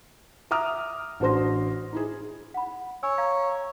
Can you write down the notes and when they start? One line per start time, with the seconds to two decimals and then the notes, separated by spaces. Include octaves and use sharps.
0.51 E5 A#5 D6 D#6 F6
1.20 A1 D4 F#4 C5 C6 A#6
1.93 D#4 E4 G#4
2.54 F#5 B5
3.03 C#5 G#5 E6
3.18 F5 A#5 G#6